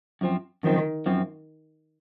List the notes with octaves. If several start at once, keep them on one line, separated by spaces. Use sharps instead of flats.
F#2 F3 C4
F#2 D#3 F3 C4
F#2 F3 C4